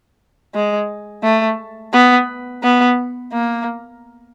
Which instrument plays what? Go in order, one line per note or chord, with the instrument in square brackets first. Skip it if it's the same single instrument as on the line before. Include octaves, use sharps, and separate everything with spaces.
[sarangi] G#3
A3
B3
B3
A#3